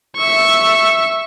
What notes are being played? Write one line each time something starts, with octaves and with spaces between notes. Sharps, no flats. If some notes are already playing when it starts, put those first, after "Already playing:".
E5 C#6